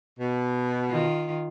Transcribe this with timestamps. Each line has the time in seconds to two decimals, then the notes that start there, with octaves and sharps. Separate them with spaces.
0.20 B2
0.90 D#3 F4